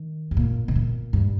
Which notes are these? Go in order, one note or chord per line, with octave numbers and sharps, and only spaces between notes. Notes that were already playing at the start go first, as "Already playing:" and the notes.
Already playing: D#3
G2
A#2
C3
A#2
G2